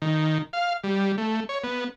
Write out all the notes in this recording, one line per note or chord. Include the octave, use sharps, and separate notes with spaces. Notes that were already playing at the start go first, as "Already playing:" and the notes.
D#3
F5
G3
A3
C#5
B3